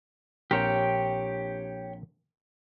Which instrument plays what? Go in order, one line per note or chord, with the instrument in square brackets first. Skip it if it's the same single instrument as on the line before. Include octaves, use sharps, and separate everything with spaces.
[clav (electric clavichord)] A#1 C4 A#4 [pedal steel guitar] G4 C#5 G5